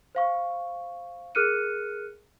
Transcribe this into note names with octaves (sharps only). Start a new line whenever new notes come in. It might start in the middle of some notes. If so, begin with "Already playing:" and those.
C5 F5 C#6
G#4 A#4 F6 F#6 C#7 D#7